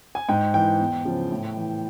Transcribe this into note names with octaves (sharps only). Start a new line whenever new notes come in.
G#5
G#2 G5
E3 G5
E2
C#3 F3
A2
E3